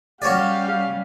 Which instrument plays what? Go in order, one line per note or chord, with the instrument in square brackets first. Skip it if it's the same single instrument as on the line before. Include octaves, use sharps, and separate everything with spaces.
[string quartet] G3 C#4 [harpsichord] F#4 C#5 D5 [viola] G4 [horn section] F5